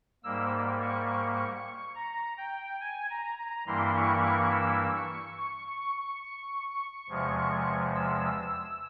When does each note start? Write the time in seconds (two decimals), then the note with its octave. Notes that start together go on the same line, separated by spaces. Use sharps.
0.24 G#2 G3 A#3 E6
0.82 C#6
1.95 A#5
2.38 G5
2.81 G#5
3.10 A#5
3.38 A#5
3.66 G2 E3 G3 A#3 E4 C6
3.95 C#6
4.23 C#6
4.52 E6
4.96 C#6
5.38 C#6
5.67 C#6
5.95 C#6
7.09 E2 C3 F3 G#3
7.95 E6